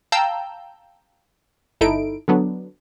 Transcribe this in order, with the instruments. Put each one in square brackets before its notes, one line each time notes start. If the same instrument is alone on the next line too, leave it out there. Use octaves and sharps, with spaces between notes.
[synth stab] F5 G5 A5 A#5 E6 G6
G1 D#4 E4 A4 D7
D3 F#3 B3 D4